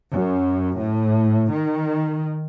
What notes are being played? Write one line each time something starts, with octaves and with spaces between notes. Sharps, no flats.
F#2
A2
D#3